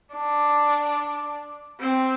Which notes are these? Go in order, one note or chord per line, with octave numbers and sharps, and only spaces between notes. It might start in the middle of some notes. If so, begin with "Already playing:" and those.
D4
C4